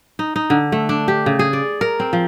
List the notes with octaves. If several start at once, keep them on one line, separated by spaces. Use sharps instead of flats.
D#4
D#4
D3
A3
D4
G4
C#3
G#4
D5
A#4
C4
F3